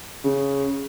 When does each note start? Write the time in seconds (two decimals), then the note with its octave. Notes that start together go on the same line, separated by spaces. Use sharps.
0.24 C#3